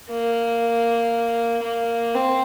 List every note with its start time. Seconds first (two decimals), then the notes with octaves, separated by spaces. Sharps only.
0.10 A#3
1.63 A#3
2.14 C4